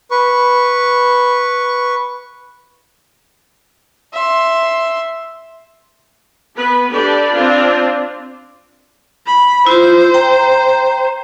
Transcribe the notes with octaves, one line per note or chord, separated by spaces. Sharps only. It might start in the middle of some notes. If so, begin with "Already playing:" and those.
B4 C#6
E5 C6
B3 B4
D4 G4 A4 B4 D5
C4 D4 F4
B5
E4 F4 C5
G5 A#5